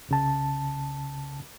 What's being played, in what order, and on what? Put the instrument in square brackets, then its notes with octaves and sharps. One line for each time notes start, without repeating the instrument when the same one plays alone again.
[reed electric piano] C2 C#3 A5